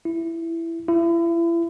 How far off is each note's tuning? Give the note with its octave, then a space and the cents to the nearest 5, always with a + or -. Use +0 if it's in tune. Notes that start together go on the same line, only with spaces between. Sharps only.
E4 +10
E4 +35